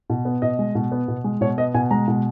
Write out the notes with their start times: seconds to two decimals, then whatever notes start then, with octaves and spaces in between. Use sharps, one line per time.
0.10 B2
0.25 B3
0.42 B2 D#5
0.59 G#3
0.75 B2
0.92 B3
1.08 B2
1.24 G#3
1.41 B2 C#5
1.58 B3 D#5
1.74 B2 G#5
1.91 G#3 A#5
2.08 B2